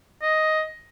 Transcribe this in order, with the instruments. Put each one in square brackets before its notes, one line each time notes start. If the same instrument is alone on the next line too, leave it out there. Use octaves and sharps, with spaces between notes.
[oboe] D#5